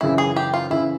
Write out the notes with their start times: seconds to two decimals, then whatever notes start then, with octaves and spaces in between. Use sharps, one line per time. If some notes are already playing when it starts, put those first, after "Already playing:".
0.01 F#2 C#3 E3 E4
0.18 G#4
0.36 G4
0.54 F4
0.70 C#3 E3 E4